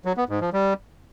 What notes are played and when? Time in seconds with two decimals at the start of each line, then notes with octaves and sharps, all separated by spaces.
0.05 F#3
0.17 B3
0.29 G#2
0.41 F3
0.53 G3